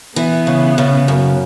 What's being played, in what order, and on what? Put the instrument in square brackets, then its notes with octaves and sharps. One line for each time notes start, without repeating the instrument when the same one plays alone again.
[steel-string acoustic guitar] E3 [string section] B3
[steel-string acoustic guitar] C#3
C#3
F#2